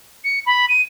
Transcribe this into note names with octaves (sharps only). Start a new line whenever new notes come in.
C#7
B5
D#7